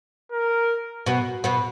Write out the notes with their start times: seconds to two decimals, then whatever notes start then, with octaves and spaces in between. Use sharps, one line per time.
0.32 A#4
1.06 B2 B3
1.44 B2 B3